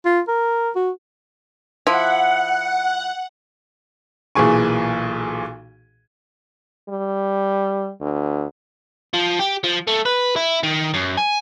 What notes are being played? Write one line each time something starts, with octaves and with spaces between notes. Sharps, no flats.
F4
A#4
F#4
F3 E4 F#5
B1 A#2 E3 G#4 G#5 C#6
G3
D2
F3
G4
F3
A3
B4
E4
D#3
F#2
G#5